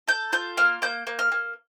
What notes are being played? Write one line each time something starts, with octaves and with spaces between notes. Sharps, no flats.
A4 G6
F4 G6
A#3 F6
A#3 G6
A#3
F6
A#3